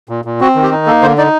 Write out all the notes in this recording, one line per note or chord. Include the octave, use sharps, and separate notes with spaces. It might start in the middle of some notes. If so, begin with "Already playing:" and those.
A#2
A#2
C4 F#4
D#3
G4
D#4
A#3 A4
D3 C5
D#4 D5